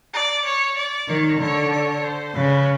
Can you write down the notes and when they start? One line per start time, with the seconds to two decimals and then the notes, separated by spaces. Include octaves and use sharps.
0.14 D5
0.45 C#5
0.78 D5
1.09 D#3 C#5
1.41 D3 C#5
1.72 C#5
2.04 C5
2.36 C#3 B4